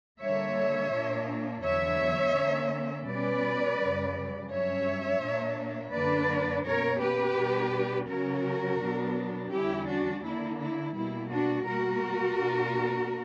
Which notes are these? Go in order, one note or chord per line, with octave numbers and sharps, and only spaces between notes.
D3 G3 A#3 C#5 E5
A#2 A#3 D4
E2 D3 F#3 B3 C#5 E5
D3 A#3 C#4
B2 G3 C#4 B4 D5
F#2 C#3 G3
G2 F#3 C#4 C#5 E5
A#2 A#3 D4
F#2 D3 A#3 D4 B4 D5
B2 A#3 C#4 A#4 C#5
G4 B4
B2 G3 B3 D4
C#3 F#3 C#4 F#4 A#4
B2 F#3 B3 D4
E2 D3 G3 C#4 E4 G4
D4 F#4
D3 A#3 D4 E4
E4
B2 G3 A#3 E4
D4 F#4
B2 G3 A#3 F#4 A#4
B2 A#3 D4